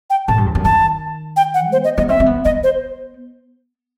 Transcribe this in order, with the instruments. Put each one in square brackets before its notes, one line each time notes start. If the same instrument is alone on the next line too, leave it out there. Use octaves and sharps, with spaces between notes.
[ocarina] G5
[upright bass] A2 [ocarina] A5
[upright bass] G2
E2
F#2
[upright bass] D#3 [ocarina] A5
[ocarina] G5
F#5
[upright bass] B3 [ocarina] C5
[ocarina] D#5
[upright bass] B3 [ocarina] D#5
[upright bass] C4 [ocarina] E5
[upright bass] C4
B3
[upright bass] B3 [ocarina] D#5
[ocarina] C5